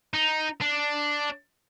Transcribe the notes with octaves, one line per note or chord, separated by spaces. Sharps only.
D#4
D4